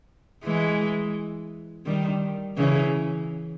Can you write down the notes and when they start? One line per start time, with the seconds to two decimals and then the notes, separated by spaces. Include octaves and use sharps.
0.44 E3 G#3
1.86 D#3 G3
2.58 C#3 E3